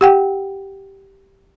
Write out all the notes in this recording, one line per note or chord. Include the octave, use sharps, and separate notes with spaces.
G4 F#5 G5